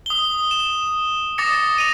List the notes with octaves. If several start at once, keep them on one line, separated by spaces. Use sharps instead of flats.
D#6 G7
E7
D6 D#6 A6 A#6 C#7
D#7 F7